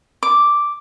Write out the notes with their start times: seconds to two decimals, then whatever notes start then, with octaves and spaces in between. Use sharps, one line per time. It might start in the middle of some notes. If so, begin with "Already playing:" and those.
0.23 D6